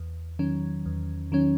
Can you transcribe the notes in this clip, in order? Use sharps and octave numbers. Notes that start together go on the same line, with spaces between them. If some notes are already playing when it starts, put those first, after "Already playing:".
Already playing: E2
D#3 F#3 C#4
E2
D#3 F#3 C#4